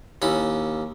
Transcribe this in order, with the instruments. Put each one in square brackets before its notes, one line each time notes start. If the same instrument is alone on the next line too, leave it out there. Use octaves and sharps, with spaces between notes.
[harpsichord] D#2 C#4 E4